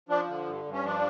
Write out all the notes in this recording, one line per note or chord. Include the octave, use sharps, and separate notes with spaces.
F3 D4
D3
G2
G2
C#4
F3 D4